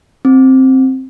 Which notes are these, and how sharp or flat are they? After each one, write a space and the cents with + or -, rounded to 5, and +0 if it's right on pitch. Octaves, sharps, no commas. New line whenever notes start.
C4 +5